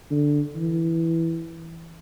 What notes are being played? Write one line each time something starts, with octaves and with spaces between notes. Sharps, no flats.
D3
E3